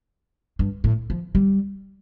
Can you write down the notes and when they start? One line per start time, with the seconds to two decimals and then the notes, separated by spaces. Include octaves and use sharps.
0.59 G2
0.84 A2
1.10 F3
1.35 G3